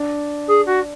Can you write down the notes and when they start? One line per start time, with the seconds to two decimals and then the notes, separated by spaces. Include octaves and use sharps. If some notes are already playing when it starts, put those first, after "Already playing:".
Already playing: D4
0.47 G#4
0.65 F#4